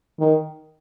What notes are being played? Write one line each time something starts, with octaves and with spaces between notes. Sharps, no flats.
D#3